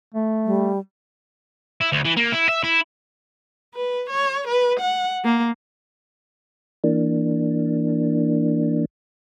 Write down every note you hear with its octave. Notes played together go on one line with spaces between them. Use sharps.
A3
G3
E4
D2
E3
A#3
E4
E5
E4
B4
C#5
B4
F#5
A#3
E3 A#3 D4